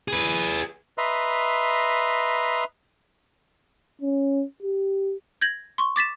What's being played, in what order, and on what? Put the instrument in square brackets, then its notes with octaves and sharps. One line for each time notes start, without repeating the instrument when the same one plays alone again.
[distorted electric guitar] G#4 B4
[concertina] B4 D#5 E5 A#5 C6
[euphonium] C#4
G4
[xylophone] G6 G#6 A#6 F#7
C6 C#6
D6 A6 B6 E7